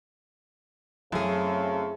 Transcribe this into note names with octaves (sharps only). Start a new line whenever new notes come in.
F#2 C#3 A3 C4 E4 G#4